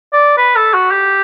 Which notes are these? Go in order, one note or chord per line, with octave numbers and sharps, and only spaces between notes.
D5
B4
A4
F#4
G4